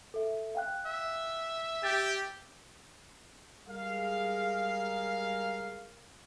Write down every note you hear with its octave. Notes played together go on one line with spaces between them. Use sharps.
A4 E5
F5 G5 F#6
E5
G4 G6 A6
G3 G#3 G#4 A#4 F5